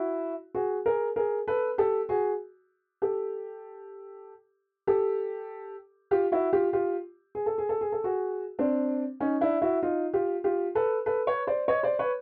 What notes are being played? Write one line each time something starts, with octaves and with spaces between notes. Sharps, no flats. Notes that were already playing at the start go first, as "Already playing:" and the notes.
Already playing: E4 F#4
F#4 G#4
G#4 A#4
G#4 A#4
A4 B4
G4 A4
F#4 G#4
G4 A4
G4 A4
F4 G4
E4 F#4
F4 G4
F4 G4
G#4
A4
G#4
A4
G#4
A4
F#4 G#4
C4 D4
C#4 D#4
D4 E4
E4 F#4
D#4 F4
F4 G4
F4 G4
A4 B4
A4 B4
B4 C#5
C5 D5
C#5 D#5
C5 D5
B4 C#5